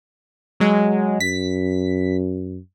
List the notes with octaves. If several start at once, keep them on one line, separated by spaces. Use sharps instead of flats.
F#3 G#3
F#2 B6